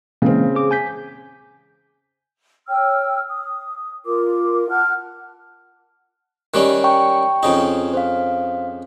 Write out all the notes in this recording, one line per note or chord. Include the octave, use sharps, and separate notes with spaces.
C#3 E3 G#3 A#3 C4
G#4 D6
G#5 G6 B6
C#5 G5 E6 F6
D#6
F4 A#4 D6
F#5 A5 F6 F#6
D#3 G3 C#4 F#6
G5 A#5 C#6
F2 C#3 D#4
C5 F5